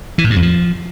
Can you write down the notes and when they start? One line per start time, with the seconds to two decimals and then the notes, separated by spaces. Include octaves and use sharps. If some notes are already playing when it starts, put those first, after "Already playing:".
0.18 E3
0.24 A2
0.30 G2
0.36 F2
0.42 F3